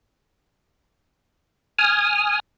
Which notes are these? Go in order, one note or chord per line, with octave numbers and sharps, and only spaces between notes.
G#5 D#6 F6